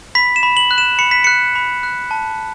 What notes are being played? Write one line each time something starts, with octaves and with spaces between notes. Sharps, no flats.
B5 B6
E7
B5
F#7
F#6
E7
B5 C#7
B6
F#6 C#7
B5
F#6
A5